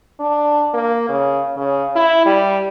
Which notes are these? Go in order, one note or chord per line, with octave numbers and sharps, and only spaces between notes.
D4
A#3
C#3
C#3
E4
G3